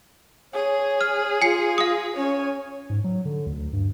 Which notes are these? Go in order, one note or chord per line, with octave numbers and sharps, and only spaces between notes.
G#4 C#5
F6
F4 G#5 C7
F5 D#6
C#4 C#5 G#5
G#2
F#3
D3
D2
G2